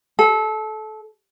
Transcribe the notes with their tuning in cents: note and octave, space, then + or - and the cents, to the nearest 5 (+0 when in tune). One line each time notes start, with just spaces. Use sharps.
A4 -25